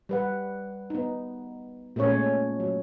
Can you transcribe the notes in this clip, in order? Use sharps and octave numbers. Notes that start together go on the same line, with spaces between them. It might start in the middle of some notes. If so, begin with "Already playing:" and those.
G3 B4 F#5
B3 D#4
A#2 G#3 A3 C#4 C#5
F#3